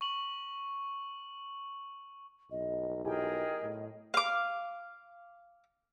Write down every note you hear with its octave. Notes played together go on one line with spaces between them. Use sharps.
C#6 F#7
B1 D#5
E4 G4 G#4 A#4 D#5 G5 G#5
A2
F5 D6